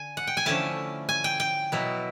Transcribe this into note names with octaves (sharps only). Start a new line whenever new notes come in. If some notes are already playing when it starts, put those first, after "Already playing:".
Already playing: D3 G#5
F#5
G5
G#5
D3 F3 A3 C#4 E4 A5
G#5
G5
G5
B2 F#3 B3 E4